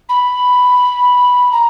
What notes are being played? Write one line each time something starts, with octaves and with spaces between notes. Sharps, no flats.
B5
A#5